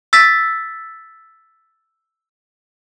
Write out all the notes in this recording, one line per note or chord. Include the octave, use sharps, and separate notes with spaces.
E6 A6 B6